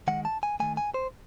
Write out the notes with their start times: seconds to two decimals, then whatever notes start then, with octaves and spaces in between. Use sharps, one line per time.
0.08 D#3 G#3 F#5
0.25 A5
0.43 G#5
0.60 D#3 A3 G#5
0.77 G#5
0.94 C5